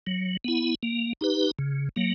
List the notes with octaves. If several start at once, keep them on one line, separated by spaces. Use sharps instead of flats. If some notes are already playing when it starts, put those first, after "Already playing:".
F#3
B3 E4
A#3
D#4 G4 B4
C#3
F#3 A#3